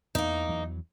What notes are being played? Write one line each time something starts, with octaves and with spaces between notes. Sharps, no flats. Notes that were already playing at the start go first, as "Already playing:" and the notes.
E2 E3 A#3 D#4
E2 E3 F#3